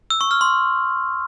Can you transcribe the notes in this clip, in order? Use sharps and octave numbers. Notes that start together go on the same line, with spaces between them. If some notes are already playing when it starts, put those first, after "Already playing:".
E6
C#6
F6
C6